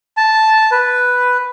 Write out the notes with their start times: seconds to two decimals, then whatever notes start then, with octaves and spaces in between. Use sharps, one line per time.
0.17 A5
0.72 B4